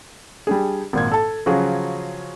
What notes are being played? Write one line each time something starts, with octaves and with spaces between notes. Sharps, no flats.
G3 D4 G#4
G#1 A#2 G#6
A4 A5
C#3 F3 F#3 F#4 G#4